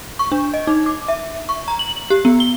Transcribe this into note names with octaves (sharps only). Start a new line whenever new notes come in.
C#6
D4
D#5
D#4
D6
E5
C#6
A#5
F#7
G4
B3
G7